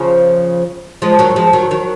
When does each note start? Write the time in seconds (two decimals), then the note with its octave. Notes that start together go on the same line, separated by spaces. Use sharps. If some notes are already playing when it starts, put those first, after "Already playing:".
Already playing: C#3 F3
1.02 F3 G#3
1.19 D#3 F#3
1.36 F3 G#3
1.53 D#3 F#3
1.71 D#3 F#3